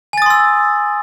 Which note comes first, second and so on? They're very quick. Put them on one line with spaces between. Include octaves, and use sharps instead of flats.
G#5 A6 D#6 C6 E6